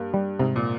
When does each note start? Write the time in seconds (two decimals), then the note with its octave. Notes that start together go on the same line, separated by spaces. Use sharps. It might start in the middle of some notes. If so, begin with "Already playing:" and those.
Already playing: G2 A#3
0.14 G3
0.39 G#2 C3
0.56 A#2